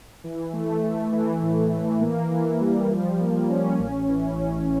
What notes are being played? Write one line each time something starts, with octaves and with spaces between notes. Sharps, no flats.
E3
A3
A3
E3
A2
E3
A#3
E3
G3
F3
A#3
C#4
A1
E3
A1